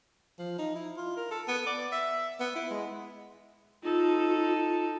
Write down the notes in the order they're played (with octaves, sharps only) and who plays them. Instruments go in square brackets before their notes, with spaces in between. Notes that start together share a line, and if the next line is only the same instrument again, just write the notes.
[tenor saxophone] F3
D#4
E4
F4
A#4
A4
B3
D5
E5
B3
E4
G#3
[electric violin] D#4 A4 [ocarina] F4